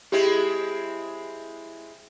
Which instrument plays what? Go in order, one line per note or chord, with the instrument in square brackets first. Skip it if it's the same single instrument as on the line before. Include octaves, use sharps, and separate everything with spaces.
[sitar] G#3 C4 E4 [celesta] G4